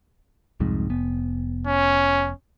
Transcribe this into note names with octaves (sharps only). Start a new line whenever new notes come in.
C2 F2 G#2
F1 B3
C#4